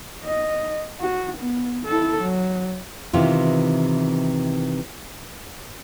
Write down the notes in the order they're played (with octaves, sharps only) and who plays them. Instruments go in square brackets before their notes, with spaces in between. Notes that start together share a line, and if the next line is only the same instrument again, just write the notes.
[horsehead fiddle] D#5
F#4
B3
E4 A4
F#3
[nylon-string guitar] C3 D#3 E3 B3 C4 F4